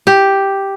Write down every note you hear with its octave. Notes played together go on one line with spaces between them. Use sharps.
G4